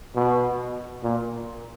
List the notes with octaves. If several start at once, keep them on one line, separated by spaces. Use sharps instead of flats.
B2
A#2